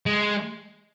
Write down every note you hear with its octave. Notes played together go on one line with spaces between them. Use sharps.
G#3